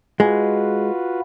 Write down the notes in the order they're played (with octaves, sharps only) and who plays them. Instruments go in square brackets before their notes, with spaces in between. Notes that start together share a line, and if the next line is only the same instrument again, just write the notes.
[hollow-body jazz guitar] G#3 [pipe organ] F4 F#4 B4